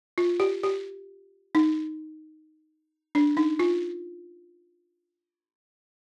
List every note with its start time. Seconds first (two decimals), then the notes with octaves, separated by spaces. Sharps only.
0.18 F4
0.40 G4
0.63 G4
1.55 D#4
3.15 D4
3.37 D#4
3.59 F4